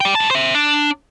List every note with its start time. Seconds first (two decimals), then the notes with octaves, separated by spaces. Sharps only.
0.01 D5 G5
0.15 G2 A5
0.31 C5 E5
0.55 D4